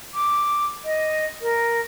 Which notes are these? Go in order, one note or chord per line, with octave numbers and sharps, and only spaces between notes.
D6
D#5
A#4